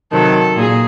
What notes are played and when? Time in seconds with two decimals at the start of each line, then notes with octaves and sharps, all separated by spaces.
0.12 C3 D#3 F#3 A4
0.57 A#2 G#4